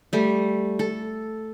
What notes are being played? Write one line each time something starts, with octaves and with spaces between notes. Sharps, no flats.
G3 A3
A4